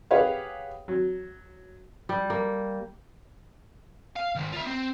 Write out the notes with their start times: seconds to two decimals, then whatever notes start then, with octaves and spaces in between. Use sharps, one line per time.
0.11 G4 G#4 B4 C#5 F5 F#5
0.88 F#3
2.09 G3
2.30 A#3
4.16 F5
4.35 D#3 G#3
4.52 F4 E5
4.66 C4